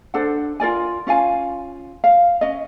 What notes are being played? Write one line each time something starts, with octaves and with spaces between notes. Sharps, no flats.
D4 A4 C5 F#5
F4 A#4 D5 G#5
C#4 F4 F5 G#5
F5
C#4 D#5